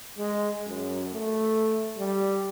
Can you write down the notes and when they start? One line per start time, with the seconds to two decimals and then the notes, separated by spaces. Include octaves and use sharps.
0.18 G#3
0.67 F#2
1.12 A3
1.97 G3